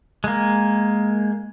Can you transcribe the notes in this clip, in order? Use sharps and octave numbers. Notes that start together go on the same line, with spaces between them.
G#3 A#3